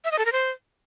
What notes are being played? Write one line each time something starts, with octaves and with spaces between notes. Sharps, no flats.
E5
D#5
A4
A#4
C5